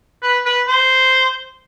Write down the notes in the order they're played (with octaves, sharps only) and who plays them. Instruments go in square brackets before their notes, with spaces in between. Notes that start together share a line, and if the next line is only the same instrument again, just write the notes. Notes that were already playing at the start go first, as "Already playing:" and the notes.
[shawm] B4
B4
C5